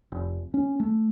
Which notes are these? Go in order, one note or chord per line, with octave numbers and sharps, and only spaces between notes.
F1
C#4
A3